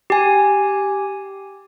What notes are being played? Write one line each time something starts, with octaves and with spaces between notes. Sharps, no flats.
G4 G#5